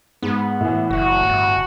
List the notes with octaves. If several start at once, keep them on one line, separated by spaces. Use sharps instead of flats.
G#2 B3
A2 E3
F#1 F#4
G1